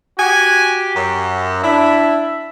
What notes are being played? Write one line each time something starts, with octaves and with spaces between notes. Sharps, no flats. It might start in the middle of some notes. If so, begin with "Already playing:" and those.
F#4 G4 G#5
F#2
D4 E4 E5